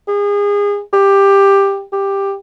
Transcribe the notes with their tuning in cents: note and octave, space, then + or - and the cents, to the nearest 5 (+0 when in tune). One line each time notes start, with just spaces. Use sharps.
G#4 -30
G4 +10
G4 +10